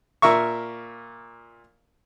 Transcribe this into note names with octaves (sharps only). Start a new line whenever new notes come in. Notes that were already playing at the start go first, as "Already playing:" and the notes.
A#2 A#4 E5 C#6